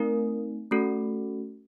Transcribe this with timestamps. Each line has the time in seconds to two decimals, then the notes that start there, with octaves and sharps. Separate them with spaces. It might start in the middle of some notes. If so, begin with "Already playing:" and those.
Already playing: A3 C4 D#4 A#4
0.71 A3 C#4 F#4 A4